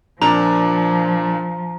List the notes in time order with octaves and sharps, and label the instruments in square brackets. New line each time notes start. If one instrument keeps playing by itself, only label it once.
[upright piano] A#2 D4 [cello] F3 [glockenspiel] A#5